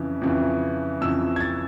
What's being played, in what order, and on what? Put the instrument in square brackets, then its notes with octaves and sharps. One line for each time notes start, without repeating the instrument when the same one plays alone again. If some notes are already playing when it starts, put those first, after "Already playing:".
Already playing: [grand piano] F2 C#3 E3
F2 C#3 E3
F2 C#3 E3 E6
G#6
A6